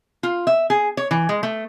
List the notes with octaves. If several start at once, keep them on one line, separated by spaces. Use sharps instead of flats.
F4
E5
G#4
C#5
E3
G#3
A3